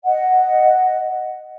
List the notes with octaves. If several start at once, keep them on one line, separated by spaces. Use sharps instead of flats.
D#5 F#5